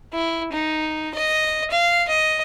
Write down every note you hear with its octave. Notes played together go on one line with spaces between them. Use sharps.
E4
D#4
D#5
F5
D#5